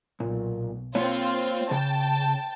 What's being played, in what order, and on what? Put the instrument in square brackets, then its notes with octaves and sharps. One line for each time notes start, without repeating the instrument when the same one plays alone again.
[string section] B1 [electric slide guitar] A#2
[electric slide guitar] A#3 C#5 [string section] C4 F4
[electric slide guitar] C#3 [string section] G5 A5